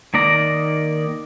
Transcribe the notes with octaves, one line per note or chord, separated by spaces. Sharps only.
D#3 A#3 D5 A#5